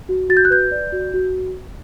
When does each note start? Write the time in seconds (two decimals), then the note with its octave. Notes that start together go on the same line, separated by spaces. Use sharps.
0.09 F#4
0.29 F#4 A6
0.37 G6
0.45 F#6
0.50 B4 G6
0.71 D5
0.92 F#4
1.14 F#4